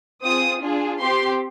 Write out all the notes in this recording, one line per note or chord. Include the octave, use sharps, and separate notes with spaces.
C4 F4 G#4 D#6
D4 F4 G#4
C4 G4 C6